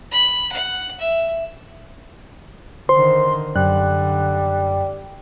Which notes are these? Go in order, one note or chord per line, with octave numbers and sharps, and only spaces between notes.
B5
F#5
E5
D3 D#3 C5 C6
F#2 D3 G3 F#6